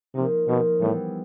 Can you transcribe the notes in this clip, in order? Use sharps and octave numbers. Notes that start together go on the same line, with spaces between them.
C3 F3 A#3 D#4
B2 F3 A#3 D#4
A2 E3 G3 B3 E4 G#4